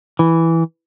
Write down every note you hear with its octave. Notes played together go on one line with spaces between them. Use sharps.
E3